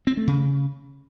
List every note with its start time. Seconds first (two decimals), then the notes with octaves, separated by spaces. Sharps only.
0.07 C4
0.17 A3
0.27 C#3